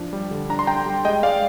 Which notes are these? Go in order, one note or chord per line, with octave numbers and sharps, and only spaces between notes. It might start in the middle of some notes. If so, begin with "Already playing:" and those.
Already playing: F3 D4
G3
D3
D4 A#5
C6
D4 G5 A#5
G3
G#3 D#5 G5
G#3 D5 F5